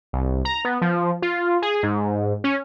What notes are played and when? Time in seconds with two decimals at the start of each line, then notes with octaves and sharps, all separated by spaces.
0.13 C2
0.45 A#5
0.65 B3
0.82 F3
1.22 F4
1.62 G#4
1.83 G#2
2.44 C#4